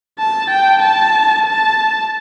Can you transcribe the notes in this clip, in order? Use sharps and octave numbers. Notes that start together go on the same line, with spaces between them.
A5
G5
A5
A5